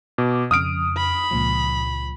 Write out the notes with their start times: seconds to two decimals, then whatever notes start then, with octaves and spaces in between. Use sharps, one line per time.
0.18 B2 D6
0.51 F2 C#3 D#6 F6 D7
0.97 B5
1.31 C#2 A#2 F3